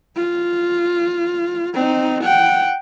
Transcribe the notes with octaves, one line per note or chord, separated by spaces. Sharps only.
F4
C4 D#4
F#5 G5